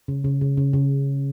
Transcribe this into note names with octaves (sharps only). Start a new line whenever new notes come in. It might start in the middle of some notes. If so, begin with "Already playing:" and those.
C#3
C#3
C#3
C#3
C#3